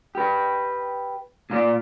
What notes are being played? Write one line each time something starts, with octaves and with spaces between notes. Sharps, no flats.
G4 B4
A#2 F4 D5